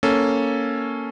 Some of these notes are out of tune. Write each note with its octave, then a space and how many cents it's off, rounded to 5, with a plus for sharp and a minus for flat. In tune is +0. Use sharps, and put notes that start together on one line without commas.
A#3 +0 C#4 +0 A4 +0